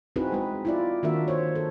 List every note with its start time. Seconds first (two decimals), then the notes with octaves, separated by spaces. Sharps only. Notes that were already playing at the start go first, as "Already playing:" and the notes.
0.16 C4 D#4 E4 F#4 G#4 B4
0.32 G#3 B4
0.65 E4 F4 D5
1.03 D#3 A#3 D4 F#4 A#4 E5
1.28 C5 C#5
1.55 A4